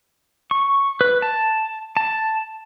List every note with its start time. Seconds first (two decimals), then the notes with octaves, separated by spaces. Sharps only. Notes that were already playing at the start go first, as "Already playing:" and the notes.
0.51 C#6
1.01 B4
1.22 A5
1.97 A5